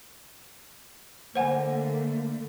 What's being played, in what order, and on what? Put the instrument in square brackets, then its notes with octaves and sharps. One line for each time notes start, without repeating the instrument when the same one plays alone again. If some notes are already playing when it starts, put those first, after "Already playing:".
[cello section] D3 A3 A#3 [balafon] C5 F#5 G#5